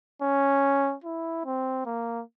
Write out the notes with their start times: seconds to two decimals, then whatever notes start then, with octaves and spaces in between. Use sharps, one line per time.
0.22 C#4
1.04 E4
1.45 C4
1.86 A#3